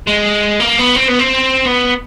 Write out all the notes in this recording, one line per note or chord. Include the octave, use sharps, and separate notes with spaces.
G#3
A#3
B3
C4
B3
C4
B3